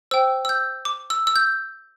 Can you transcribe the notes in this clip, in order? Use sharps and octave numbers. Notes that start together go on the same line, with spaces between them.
C5 G5 E6
E6
G6
D6
E6
E6
G6